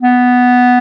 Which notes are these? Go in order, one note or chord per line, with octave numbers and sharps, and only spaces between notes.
B3